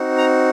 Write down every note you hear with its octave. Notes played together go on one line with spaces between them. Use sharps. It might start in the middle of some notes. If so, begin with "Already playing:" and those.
Already playing: C4 D#4 F#4
A#5